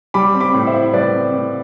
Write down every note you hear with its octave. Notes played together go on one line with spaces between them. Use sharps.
G3 B5 D6
C4
B5 D6
A2
C5 E5
E4
G3 B4 D5
C4
A2